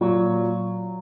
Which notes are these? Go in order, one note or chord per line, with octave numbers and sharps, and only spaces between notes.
A#2 F#3